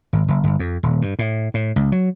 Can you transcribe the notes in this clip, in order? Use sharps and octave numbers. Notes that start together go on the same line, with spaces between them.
G#1
F#1
G1
F2
D#1
G2
A2
A2
C#2
F#3